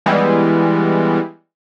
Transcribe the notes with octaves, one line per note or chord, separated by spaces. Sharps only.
E3 G3 G#3 B3